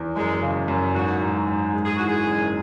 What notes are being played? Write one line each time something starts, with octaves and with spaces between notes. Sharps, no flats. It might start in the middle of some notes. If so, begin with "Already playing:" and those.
Already playing: E2
F#2 G#3
C#3
F#2
G#2 F#4
G#2
G#2
G#3
G#4
E3 F#4
G#4
F#1